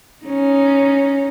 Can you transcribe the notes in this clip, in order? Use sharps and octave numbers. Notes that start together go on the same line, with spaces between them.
C#4 D#4